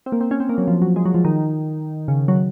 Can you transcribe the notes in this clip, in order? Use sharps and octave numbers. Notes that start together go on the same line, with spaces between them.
C4
A#3
C4
C#4
C4
A#3
F#3
F3
F#3
G#3
F#3
F3
D#3
C#3
F#3